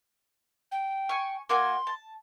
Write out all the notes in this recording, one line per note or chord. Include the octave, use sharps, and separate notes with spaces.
G5
G#5 C#6
A#3 F#4 G#5 C6
A5